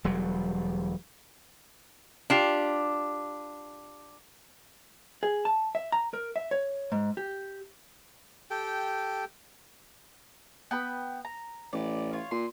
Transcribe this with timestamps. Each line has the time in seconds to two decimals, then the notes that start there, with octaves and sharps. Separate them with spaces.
0.04 E1 F#3 G3
2.30 D4 F4 G4
5.23 G#4
5.45 A5
5.75 E5
5.92 A#5
6.13 A#4
6.36 E5
6.51 C#5
6.92 G#2
7.17 G4
8.50 G4 A4 G5
10.71 B3 G5 B5
11.25 A#5
11.73 A1 D5
12.13 F4 C#5
12.31 A#2 C6